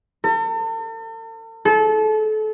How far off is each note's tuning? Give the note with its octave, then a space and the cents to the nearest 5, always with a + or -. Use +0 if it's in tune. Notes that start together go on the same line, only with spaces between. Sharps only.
A4 +45
A4 -30